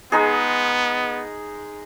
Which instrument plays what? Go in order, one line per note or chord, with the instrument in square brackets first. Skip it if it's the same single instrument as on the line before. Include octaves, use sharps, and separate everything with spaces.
[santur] G#3 D#4 G#4 [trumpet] B3